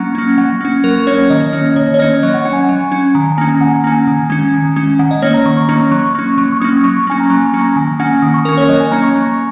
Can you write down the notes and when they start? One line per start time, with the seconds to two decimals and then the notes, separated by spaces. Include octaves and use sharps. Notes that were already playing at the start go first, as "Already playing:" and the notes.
Already playing: F#3 A#3 C#4 F#5 A#5
0.15 A#3 C#4
0.38 F#3 F#5
0.61 A#3 C#4
0.84 F#3 A#4
1.07 A#3 C#4 C#5
1.30 D#3 D#5
1.53 A#3 C#4
1.76 D#3 C#5
1.94 C#5
1.99 A#3 C#4 D#5
2.23 F#3 D#5
2.34 F#5
2.45 C#4 F#5
2.53 G#5
2.57 F#5
2.69 F#3
2.92 C#4
3.15 D#3 A#5
3.32 A#5
3.37 A#3 C#4 G#5
3.61 D#3 F#5
3.76 A#5
3.84 A#3 C#4
3.92 G#5
4.07 D#3
4.30 G#3 C#4
4.54 D#3
4.76 G#3 C#4
4.99 D#3 F#5
5.11 D#5
5.22 A#3 C#4 C#5
5.34 A#5
5.46 D#3 C#6
5.57 C#6
5.69 A#3 C#4 A#5
5.80 C#6
5.91 F#3 C#6
6.15 A#3 C#4 C#6
6.38 F#3 C#6
6.52 C#6
6.61 A#3 C#4 D#6
6.84 F#3 C#6
7.07 A#3 C#4 G#5
7.20 A#5
7.30 F#3 C#6
7.45 C#6
7.53 A#3 C#4
7.61 A#5
7.76 D#3 G#5
8.00 A#3 C#4 F#5
8.22 D#3 D#6
8.34 C#6
8.45 A#3 C#4 A#4
8.57 C#5
8.69 F#3 D#5
8.80 G#5
8.92 A#3 C#4 A#5
9.03 C#6
9.15 F#3 A#5